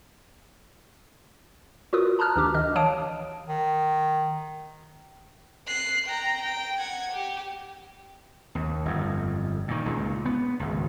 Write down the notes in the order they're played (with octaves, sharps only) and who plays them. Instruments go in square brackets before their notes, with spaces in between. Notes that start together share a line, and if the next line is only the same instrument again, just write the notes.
[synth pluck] F4 F#4 A#4 B4 D#6
A5 A#5 D#6 F6 F#6
D2 D#3 D4 G4 D6
D#3 D#5 F6
E3 C#5 F5 A5 D#6 D7
[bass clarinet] D#3
[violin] F#6 C7
G5 A#5
G5
F#5 G#6
G4
[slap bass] D#2
G1 F2
A#2 D#3
C#2 A#2
B3
G#1 C#2